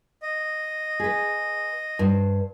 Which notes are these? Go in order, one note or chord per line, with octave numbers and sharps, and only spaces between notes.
D#5
G#4 B4
G2 C5